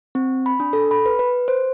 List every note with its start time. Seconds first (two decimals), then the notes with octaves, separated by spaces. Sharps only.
0.15 C4
0.46 B5
0.60 D4
0.73 A4
0.91 B5
1.06 B4
1.19 B4
1.48 C5